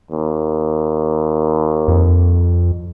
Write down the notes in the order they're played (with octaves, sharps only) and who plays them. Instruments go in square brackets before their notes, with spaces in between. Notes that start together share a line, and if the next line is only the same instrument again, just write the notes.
[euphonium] D#2
[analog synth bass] F2